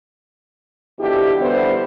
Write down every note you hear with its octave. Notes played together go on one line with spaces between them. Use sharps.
B2 D3 F3 E4 G4
D3 E3 G3 B3 B4 C5